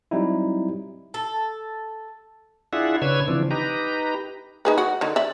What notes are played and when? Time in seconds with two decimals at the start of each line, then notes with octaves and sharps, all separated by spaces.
0.11 F#3 G3 C4 D#4 E4
1.14 A4
2.73 D4 E4 F4 G#4 E5 F#5
3.02 C#3 D4 B4 C#5 E6 G#6
3.28 C#3 E3 F3 C4 D4
3.51 D#4 G4 B4 A#5
4.65 D#4 G#4 B4
4.78 F#4
5.01 D3 D#3
5.16 D5 E5